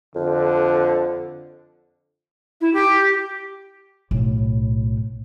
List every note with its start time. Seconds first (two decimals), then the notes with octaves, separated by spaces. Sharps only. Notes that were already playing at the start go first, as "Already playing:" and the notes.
0.15 F2 D3
2.61 E4
2.73 G4
4.11 B1 A2